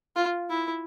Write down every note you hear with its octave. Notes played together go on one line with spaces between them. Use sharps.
F4
E4